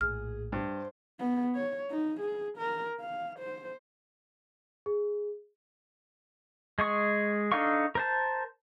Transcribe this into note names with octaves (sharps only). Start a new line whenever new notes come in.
A#1 A2 G#4 F6
G2 C5
B3
C#5
D#4
G#4
A#4
F5
C5
G#4
G#3 G#4 C#6
D4 D#4 A4 F5 C#6
A#4 C5 A5